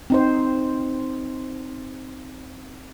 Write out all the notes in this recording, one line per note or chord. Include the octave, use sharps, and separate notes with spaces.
C4 D#4 C5